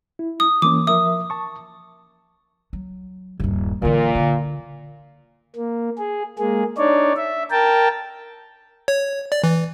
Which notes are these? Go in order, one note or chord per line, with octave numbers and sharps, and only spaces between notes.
E4
D#6
E3 A#3 C#4 D6
F3 A#4 E5 D#6
A5 C#6
F#3
D#1 G2
A#2 D3 E3
D3
A#3
G#4
G#3 A#3 G#4
D4 D#4 C#5 D5
E5
A#4 G5 A5
C#5
D5
E3